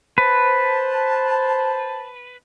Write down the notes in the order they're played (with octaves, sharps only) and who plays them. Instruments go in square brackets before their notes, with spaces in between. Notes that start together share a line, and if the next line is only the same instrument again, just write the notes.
[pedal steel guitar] B4 [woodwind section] C5 A5